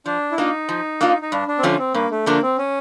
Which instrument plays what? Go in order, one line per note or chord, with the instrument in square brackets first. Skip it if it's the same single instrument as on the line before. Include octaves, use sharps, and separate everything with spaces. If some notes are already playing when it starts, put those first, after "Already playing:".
[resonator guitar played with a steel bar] F3 [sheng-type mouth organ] D4
[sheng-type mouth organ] E4
[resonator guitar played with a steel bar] A#3 D4 F4 [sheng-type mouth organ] D#4
[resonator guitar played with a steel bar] F3
A#3 D4 F4
[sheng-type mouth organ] D#4
[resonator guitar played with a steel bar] G2 [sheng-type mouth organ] D4
[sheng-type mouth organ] D4
C4
[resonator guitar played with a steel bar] D3 F3 A3 D4 [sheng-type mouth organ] C#4
[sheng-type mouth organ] C4
[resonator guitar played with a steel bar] G2 [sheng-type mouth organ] A#3
[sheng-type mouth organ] A3
[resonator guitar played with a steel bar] D3 F3 A3 D4 [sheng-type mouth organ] A#3
[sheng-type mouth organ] C4
C#4